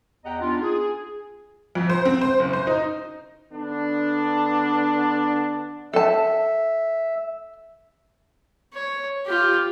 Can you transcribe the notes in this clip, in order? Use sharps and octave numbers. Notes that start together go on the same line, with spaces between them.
E2 G4 D#5 F#5 A#5
B3 D4 D#4 F4
G#4
F2
C5
C4
C5
F#1
C5
D#4
D3 B3 D4
A4 E5 A5
C#5
F4 G4